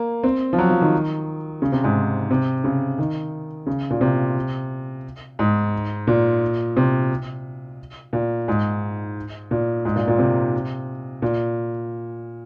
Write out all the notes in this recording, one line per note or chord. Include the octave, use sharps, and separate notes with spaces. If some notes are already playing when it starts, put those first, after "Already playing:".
Already playing: A#3
C4
F3
F#3
F3
D#3
C#3
C3
G#2
C3
C#3
D#3
C#3
A#2
C3
G#2
A#2
C3
A#2
G#2
A#2
G#2
A#2
A#2
C3
A#2